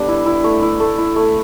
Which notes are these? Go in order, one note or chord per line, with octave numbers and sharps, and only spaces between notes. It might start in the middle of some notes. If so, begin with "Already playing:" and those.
Already playing: G3 B3 D4 A4
E4
E4
A3
E4
A3 A4
E4
A3